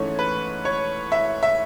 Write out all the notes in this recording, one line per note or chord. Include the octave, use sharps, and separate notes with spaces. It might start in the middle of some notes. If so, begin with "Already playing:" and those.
Already playing: G#2 E3 A3 C#4 C#5
B4
C#5
E5
E5